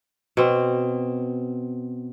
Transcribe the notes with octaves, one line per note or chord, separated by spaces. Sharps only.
B2 C4